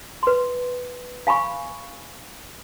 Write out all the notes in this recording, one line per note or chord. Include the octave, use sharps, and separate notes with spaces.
B4 C6
F5 G#5 B5 C#6